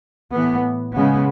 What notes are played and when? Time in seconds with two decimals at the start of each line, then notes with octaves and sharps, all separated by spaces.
0.34 A2 E3 B3
0.96 C#3 G#3 B3